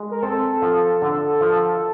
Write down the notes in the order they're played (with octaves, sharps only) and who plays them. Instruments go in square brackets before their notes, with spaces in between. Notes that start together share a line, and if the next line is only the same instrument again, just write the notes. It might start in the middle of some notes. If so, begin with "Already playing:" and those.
Already playing: [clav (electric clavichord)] G#3
[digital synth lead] A#4
[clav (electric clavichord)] C4 [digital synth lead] A4
[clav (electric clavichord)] F3
D3
F3